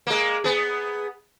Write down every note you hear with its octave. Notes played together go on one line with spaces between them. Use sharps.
G#3 A#3
B3 G#4